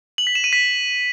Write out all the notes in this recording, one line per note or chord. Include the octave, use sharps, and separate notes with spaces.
F#7
B6
E7
D#7
B6